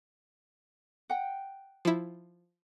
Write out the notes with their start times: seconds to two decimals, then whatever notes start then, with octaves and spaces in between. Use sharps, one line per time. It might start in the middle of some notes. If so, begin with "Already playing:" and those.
1.10 F#5 G5
1.85 F3 E4